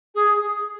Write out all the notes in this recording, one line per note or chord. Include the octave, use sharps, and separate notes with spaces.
G#4